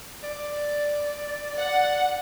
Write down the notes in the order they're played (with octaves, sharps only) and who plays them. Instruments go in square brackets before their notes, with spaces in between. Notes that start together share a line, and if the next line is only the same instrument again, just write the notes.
[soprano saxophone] D5
[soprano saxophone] D5 [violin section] F#5